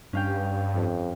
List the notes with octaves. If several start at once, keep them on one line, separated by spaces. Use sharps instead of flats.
G2 C#4 F5 G5
F2